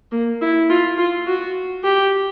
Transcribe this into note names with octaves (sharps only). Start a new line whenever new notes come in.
A#3
E4
F4
F4
F#4
G4